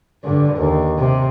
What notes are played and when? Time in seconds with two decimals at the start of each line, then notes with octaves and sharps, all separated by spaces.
0.24 G2 D3
0.57 D#2
0.98 C3